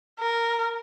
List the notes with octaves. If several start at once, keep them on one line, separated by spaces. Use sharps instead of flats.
A#4